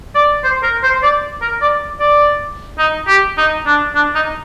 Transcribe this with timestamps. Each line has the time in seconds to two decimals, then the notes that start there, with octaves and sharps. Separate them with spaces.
0.15 D5
0.44 C5
0.63 A#4
0.83 C5
1.03 D5
1.42 A#4
1.61 D5
2.00 D5
2.78 D#4
3.08 G4
3.38 D#4
3.66 D4
3.95 D4
4.15 D#4